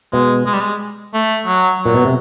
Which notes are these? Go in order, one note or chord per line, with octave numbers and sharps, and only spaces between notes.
B2 G#3
G#3
G3
G#3
A3
F#3
A#2 F#3
B2
C3